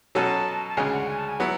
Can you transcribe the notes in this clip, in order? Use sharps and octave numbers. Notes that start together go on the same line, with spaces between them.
B2 F#3 C#4 F#4 A4 A5
A5
D2 C#3 G#3 C#4 G#5
F#5
G#5
A5
G#5
F#3 B3 E4 F#5